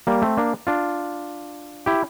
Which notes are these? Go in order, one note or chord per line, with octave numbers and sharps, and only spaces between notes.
G3 A#3
A3 C4
A#3 D4
D4 F4
E4 G4